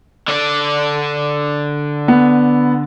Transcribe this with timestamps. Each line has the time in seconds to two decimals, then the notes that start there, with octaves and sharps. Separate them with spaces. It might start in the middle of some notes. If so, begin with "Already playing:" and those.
0.28 D3 D5
2.08 B3